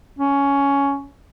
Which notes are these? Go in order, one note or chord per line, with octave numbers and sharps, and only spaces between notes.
C#4